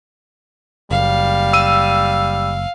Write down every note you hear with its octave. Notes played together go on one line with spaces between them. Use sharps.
F#1 G3 F5
E6 D#7